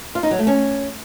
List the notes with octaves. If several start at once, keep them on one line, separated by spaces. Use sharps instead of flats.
F4
D#4
F#3
A3
C#4